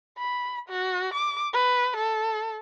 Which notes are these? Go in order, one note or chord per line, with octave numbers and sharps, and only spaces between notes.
B5
F#4
D6
B4
A4